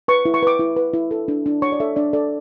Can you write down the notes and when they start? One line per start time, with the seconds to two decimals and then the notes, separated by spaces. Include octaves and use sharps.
0.08 B4 C#6
0.25 E4
0.34 C#6
0.42 B4 D6
0.59 E4
0.77 B4
0.94 E4
1.11 A4
1.28 D4
1.46 D4
1.62 C#5 C#6
1.72 D5
1.80 A4 E5
1.96 D4 D5
2.13 A4 D5